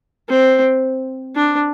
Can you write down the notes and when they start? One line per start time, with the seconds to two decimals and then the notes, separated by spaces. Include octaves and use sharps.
0.29 C4
1.35 D4